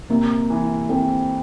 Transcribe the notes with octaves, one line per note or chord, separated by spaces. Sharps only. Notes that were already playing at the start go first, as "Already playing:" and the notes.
C3 A#3
E3
A3 C4